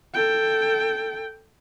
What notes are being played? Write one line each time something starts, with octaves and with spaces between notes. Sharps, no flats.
A4 G5